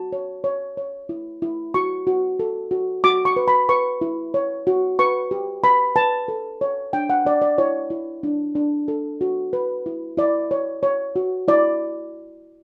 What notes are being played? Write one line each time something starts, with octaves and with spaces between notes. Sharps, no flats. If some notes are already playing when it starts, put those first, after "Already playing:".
Already playing: F#4 A5
C#5
C#5
C#5
E4
E4
F#4 C#6
F#4
A4
F#4
F#4 D6
C#6
B4
B5
B4 C#6
E4
C#5
F#4
B4 C#6
G4
B4 B5
B4 A5
A4
C#5
D4 G5
F#5
D4 D5
D5
E4 C#5
E4
D4
D4
A4
F#4
B4
E4
E4 D5
C#5
C#5
F#4
E4 D5